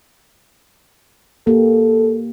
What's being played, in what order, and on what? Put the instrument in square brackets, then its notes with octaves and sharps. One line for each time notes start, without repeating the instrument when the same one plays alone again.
[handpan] A#3 G4 [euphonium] A4